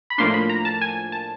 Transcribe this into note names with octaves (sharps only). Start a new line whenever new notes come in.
B5
A2 F3 A#3 D4 C6
B5
A#5
A5
G#5
A5